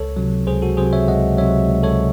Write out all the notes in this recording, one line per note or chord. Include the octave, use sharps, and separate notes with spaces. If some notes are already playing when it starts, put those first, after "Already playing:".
Already playing: C#2 A4 C#5
C3 F#3
C#2 G#4 C5
F#4 A4
C3 F#3 G#4 C5
C#5 E5
C#2 D#5 F#5
C3 F#3 C#5 E5
C#2
A4 C#5